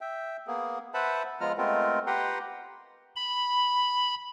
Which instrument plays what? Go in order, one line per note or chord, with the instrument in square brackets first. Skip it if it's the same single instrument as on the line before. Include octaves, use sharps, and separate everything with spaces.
[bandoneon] E5 G5
A#3 B3 G#4
B4 C5 E5 F#5 A5 B5
F3 G#3 B3 F4 A#5 F6
G#3 A3 B3 C4 F4 A#4
G4 B4 F#5 G5 A#5 C6
[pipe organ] B5